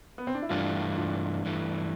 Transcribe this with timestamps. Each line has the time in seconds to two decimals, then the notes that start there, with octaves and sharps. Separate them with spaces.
0.18 B3
0.27 C4
0.35 D4
0.42 E4
0.49 G2 E3 A3 D4 F4
0.97 D4 F4
1.45 G2 E3 A3